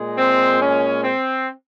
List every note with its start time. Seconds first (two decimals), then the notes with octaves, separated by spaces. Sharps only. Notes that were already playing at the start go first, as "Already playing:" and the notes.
Already playing: A#2 G#3
0.18 C4
0.61 C#4
1.04 C4